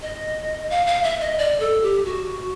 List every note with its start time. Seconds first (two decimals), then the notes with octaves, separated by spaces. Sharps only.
0.02 D#5
0.70 F5
0.86 F5
1.03 E5
1.20 D#5
1.38 D5
1.60 A4
1.83 G4
2.05 F#4